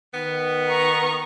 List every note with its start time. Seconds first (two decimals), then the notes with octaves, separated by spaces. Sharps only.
0.14 D#3 B3
0.69 A#5 C#6